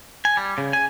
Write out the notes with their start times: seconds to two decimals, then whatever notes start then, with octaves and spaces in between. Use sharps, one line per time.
0.25 G#5
0.37 G3
0.58 C#3
0.73 G#5